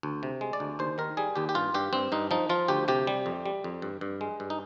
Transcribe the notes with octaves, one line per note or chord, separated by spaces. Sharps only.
D2
C3
G#3
D5
D2
D#2 C5
D#3 A#4
G3 G#4
D#2 G4
G4
G2 F4
G2 G4
G2 C4
G2 D#4
F3 D#4
F3 F4
D2 G4
C3 G4
G3
F2
G3
F2
G2
G2
G#3
G2
D#4